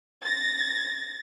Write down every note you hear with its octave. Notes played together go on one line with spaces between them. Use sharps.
A6 A#6